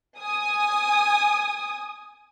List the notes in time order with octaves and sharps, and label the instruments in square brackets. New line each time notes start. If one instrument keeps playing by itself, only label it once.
[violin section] G#5 D#6